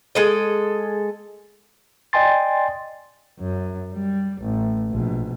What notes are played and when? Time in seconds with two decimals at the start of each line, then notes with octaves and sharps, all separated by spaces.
0.15 G#3 A4 D#5
2.13 D5 D#5 G5 G#5 C6 A6
3.39 F#2
3.94 G3
4.41 A1
4.91 A#1 B2